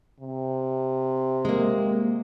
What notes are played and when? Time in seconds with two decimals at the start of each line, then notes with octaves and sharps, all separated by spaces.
0.20 C3
1.45 G#3 A#3